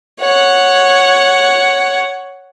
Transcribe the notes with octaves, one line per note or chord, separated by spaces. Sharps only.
C#5 F#5